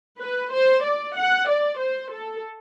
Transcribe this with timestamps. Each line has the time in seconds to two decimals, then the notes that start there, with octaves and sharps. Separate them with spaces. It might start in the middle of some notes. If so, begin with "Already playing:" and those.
0.21 B4
0.53 C5
0.85 D5
1.16 F#5
1.48 D5
1.80 C5
2.12 A4